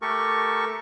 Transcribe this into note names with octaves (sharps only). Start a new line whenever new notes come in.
A3 G4 A4 A#4 C#6